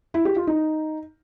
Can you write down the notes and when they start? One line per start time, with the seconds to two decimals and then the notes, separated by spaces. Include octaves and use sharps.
0.14 E4
0.25 G4
0.36 F4
0.47 D#4